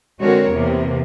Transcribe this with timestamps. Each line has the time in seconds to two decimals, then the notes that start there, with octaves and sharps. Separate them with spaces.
0.21 D3 G#3 C4 F#4 A#4 C#5
0.51 E2 C3 A#3 B3